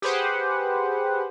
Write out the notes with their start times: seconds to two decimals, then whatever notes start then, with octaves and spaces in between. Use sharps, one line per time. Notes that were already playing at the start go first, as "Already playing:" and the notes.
0.02 G4 G#4 B4 C5 F#5